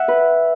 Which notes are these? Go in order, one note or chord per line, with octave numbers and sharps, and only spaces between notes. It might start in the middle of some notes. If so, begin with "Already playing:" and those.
Already playing: E5 F#5
B4